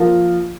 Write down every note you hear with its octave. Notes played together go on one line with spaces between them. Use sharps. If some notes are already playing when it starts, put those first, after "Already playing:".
Already playing: F3 A#3 F4 A#4